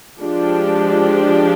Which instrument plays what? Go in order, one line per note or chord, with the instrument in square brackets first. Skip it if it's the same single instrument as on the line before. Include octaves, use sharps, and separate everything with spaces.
[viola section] F3 G#3 D4 G4